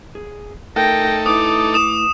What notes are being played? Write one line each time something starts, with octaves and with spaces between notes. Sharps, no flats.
G#4
A3 D#4 A4 A#4 G5 A#6
A2 E4 B4 D6 D#6
D#6 E7